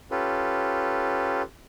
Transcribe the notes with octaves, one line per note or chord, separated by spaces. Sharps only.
C#4 F4 G4 A4 B4